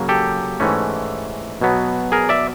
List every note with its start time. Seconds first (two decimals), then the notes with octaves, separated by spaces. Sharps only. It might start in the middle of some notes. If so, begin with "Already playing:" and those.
Already playing: C#3 F#3 A#3
0.09 G4 A4
0.60 G#2 E3 A3 C#4
1.61 B2 F#3 B3
2.12 G#4 A#4
2.29 D5 E5